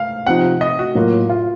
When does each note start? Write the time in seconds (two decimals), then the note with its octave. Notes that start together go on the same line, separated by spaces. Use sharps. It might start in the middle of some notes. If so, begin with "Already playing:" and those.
Already playing: F5
0.27 C3 F3 C4 D#4 F#5
0.61 D#5
0.79 F#4
0.95 A2 F#3 A#3 F4 A#4
1.29 F4